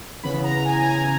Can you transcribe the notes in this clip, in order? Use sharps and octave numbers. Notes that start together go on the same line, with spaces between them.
C#3 E3 B3 B5
A#5
G#5
A#5
G#5